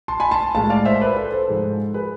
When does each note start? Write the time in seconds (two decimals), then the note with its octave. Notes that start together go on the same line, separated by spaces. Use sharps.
0.08 A5 C6
0.20 G#5 B5
0.31 A5 C6
0.55 A2 G#3 F5 A5
0.70 D5 F5
0.85 C5 E5
1.01 B4 D5
1.16 A4 C5
1.32 A4 C5
1.48 G#2 F3 G#3
1.94 G#4 B4